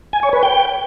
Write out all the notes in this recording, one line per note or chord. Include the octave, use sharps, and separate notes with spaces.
G#5
C#5
B4
G5